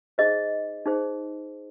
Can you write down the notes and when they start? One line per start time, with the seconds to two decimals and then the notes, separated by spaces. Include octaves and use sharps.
0.18 D#4 G#4 C5 D#5
0.85 D#4 G#4 C5